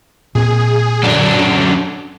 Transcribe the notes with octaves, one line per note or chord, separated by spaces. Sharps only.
A#2 C4 G#4
F#2 D3 F#3 D4